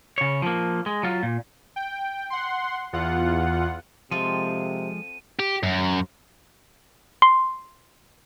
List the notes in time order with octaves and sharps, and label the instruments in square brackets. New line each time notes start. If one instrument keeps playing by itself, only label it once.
[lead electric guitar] C#3 C#5
F3 A#3
G#3
F#3 F4
A#2
[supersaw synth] G5
F#5 C6
E2 F4 F#5
[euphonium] C3 [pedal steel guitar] F3 G#3 [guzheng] C4 F4 A4 [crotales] D#7
[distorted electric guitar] G4
F#2
[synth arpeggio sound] C6